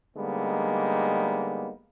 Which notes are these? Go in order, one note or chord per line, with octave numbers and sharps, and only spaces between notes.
D3 G3 G#3 A#3 B3 D#4